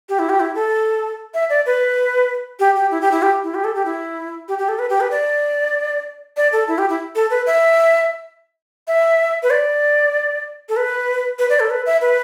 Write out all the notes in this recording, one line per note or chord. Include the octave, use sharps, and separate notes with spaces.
G4
E4
G4
E4
A4
E5
D5
B4
G4
G4
E4
G4
E4
G4
E4
G4
A4
G4
E4
G4
G4
A4
B4
G4
B4
D5
D5
A4
E4
G4
E4
A4
B4
E5
E5
B4
D5
A4
B4
B4
D5
A4
B4
E5
B4